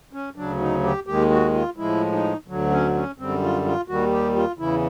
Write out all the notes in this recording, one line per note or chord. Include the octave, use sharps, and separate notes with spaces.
C#4
D2 C#3 F#3 D4
D#4
G4
D#2 D#3 G#3 G4
F#4
F4
A2 F3 G#3 E4
D#4
D2 D3 F#3
C#4
C#4
F#2 D3 G3 C4
F4
F4
D#2 D#3 G3 F#4
G4
F4
E2 C#3 E3 E4